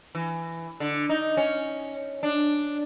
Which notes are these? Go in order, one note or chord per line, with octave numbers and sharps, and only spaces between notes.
E3
D3
D#4
C#4
D4